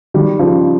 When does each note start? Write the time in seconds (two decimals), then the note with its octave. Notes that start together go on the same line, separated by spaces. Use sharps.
0.14 D#3 G3
0.39 C#3 F3